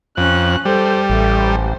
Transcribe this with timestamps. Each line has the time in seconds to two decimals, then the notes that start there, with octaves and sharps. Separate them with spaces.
0.17 F2 C#4 F#6
0.65 G3 A4 C5
1.10 A1 A3
1.41 C5